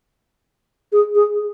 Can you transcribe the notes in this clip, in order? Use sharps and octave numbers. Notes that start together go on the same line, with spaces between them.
G#4
G#4